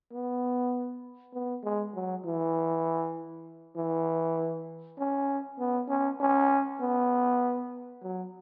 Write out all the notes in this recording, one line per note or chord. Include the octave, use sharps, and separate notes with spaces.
B3
B3
G#3
F#3
E3
E3
C#4
B3
C#4
C#4
B3
F#3